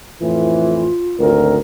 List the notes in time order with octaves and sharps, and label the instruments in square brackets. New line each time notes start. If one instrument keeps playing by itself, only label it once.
[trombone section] F2 A2 E3 [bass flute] F4
[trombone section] G#1 D2 A#4